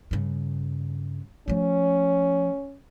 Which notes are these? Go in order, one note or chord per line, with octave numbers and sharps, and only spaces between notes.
G2 C#3
F3 A3 C#4